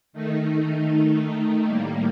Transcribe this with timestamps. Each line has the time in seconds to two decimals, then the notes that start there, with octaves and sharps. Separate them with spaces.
0.13 D#3 A3 D#4
1.65 A2 G3 A#3